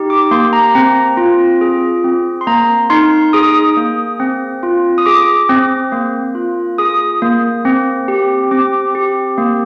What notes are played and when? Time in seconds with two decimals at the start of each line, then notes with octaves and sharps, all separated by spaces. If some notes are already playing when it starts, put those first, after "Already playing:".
Already playing: D#4 G4
0.10 D6
0.31 A#3 C6
0.53 A#5
0.75 C4
1.17 F4
1.61 G#4
2.04 C4
2.41 C6
2.47 A#3 A#5
2.90 D#4 C6
3.33 G#4 D#6
3.77 A#3
4.20 C4
4.63 F4
4.98 D#6
5.06 G#4 D6
5.49 C4
5.92 A#3
6.35 F4
6.78 G#4 D#6
7.22 A#3
7.65 C4
8.08 G4
8.51 C4 D6
8.95 G4
9.38 A#3